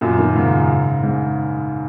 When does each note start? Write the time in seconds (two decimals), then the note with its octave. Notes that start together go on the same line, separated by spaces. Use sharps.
0.01 F#2 A#2
0.18 A#2 D#3
0.35 G#2 C#3
1.03 G#2